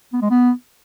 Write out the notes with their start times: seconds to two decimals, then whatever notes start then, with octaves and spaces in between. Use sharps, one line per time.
0.13 B3
0.22 G#3
0.31 B3